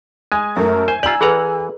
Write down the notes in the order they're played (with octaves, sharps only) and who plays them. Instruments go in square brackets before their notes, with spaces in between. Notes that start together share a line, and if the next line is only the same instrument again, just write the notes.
[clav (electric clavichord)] G#3 [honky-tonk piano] G#5
[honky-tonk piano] F#2 A3 [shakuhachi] A#4 [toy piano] E5
[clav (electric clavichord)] C5 [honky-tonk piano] G#5
[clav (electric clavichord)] F4 G4 [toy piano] D5 A#5 [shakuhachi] G#5 [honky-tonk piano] E6 F#7
[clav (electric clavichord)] E3 F#5 A#5 [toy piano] G#4 A4 B4